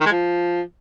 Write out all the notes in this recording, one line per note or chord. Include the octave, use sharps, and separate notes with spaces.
D#3
G#3
F3